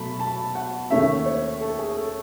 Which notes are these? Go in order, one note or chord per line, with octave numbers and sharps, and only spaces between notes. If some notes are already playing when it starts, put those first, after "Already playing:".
Already playing: B2 F#3 A3 A5 B5
A5
F#5
D#2 D#3 A3 C#4 E5
C#5
A4
G#4
A4